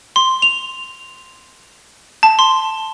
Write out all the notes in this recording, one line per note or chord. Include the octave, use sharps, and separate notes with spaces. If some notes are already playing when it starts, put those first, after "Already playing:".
C6
F7
A5
C6